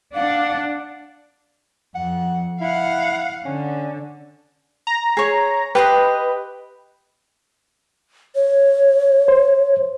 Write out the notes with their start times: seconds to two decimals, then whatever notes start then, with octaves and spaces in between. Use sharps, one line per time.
0.15 D4 F5 F#5
1.95 F2 F#5
2.61 E4 F5 F#5
3.45 D3 C#4
4.87 A#5
5.17 G#4 C#5
5.75 G4 B4 D#5 C6
8.35 C#5
9.28 C5